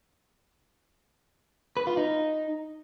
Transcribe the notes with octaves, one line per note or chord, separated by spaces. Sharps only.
B4
F4
D#4